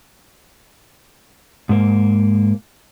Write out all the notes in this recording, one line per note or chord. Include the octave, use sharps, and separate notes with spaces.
G#2 A#3